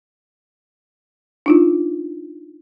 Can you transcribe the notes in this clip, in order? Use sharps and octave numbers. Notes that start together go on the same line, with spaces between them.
D4 D#4 F4